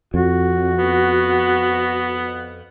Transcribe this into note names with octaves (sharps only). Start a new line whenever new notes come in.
F2 F#4
B3